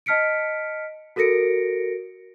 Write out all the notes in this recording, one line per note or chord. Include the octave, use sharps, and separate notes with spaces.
D#5 A5 F6 B6 C#7 D7
F#4 A4 A#4 A#6 C#7 D7